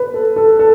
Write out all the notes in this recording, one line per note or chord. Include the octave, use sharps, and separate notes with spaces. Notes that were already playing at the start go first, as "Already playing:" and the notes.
Already playing: B4
A4
A4
A4